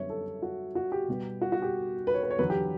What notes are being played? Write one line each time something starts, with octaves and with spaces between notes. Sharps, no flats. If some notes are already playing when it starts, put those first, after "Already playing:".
Already playing: F#2 D3 G3 B3 C#5 E5
A4
F#4
F#4
G4
B2 G3 B3
F#4
F#4
G4
B4
C#5
B4
C#5
E2 D3 F#3 B3 B4
G4